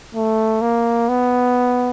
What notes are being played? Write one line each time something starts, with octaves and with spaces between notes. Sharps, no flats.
A3
A#3
B3